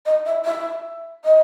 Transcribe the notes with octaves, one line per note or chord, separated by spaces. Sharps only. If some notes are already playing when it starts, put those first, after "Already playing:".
D#5
E5
E5
D#5